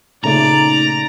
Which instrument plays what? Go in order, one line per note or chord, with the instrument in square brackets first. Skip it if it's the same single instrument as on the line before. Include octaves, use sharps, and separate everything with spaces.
[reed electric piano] A#2 C#3 A3 [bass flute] D#4 [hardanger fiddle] D5 [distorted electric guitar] A#5